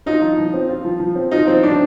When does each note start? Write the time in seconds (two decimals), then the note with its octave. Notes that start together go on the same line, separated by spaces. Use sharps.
0.06 D#4 F4
0.22 F3
0.38 F3
0.54 C4
0.69 F4
0.85 F3
1.00 F3
1.15 C4
1.31 D#4 F4
1.47 F3 C4
1.63 F3 D4